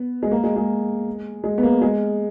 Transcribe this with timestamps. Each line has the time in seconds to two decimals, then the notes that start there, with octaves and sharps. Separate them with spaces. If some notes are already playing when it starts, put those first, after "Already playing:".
Already playing: B3
0.23 G#3
0.31 A#3
0.44 G#3
0.56 G#3
1.44 G#3
1.58 B3
1.63 A#3
1.82 G#3